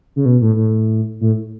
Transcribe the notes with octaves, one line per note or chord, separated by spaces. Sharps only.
C#3
B2
A2
A2
A2